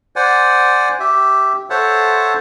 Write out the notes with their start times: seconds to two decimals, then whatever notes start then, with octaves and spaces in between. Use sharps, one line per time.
0.16 C5 D5 F#5 G#5
1.00 G4 E5
1.70 A4 C5 C#5 E5 F#5 A5